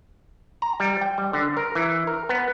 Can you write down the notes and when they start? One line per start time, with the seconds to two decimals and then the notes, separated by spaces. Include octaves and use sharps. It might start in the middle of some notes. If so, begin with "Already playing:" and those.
0.62 A#5
0.80 G3
1.01 G5
1.18 G3
1.33 D3
1.57 A#4
1.75 E3
2.07 A#4
2.29 B3